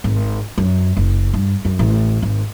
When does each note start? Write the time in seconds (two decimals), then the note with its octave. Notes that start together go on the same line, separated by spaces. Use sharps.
0.04 G#1
0.58 F#2
0.97 F#1
1.34 G2
1.65 F#2
1.79 A1
2.22 G#1